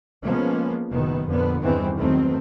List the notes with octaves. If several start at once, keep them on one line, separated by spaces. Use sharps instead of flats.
F3 G#3 A#3 B3 C#4
F#1 B2 D#3 B3
F2 A#2 D3 B3
E2 G2 D#3 E3 B3 C4
E2 D#3 F#3 A3 C4